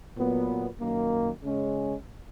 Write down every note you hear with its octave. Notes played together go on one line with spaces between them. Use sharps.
A#2 F#3 B3
F#2 D#3 A#3
C#3 G#3 C#4